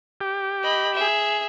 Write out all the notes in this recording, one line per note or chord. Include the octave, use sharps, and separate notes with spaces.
G4
D#5 B5
G#4 E5